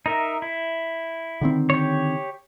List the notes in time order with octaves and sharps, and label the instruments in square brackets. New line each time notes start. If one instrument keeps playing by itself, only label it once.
[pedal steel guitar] D#4 A#4 E5
E4
[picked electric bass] D3 D#3 C4
[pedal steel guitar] G4 C#5